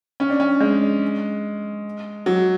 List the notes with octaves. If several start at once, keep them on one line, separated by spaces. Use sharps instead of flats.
C#4
D4
C#4
G#3
F#3